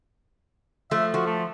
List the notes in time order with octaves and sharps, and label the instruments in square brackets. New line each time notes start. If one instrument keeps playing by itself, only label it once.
[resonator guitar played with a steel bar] F3 A3 [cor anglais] E5
[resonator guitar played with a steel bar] F3 [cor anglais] F#4
[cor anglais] A3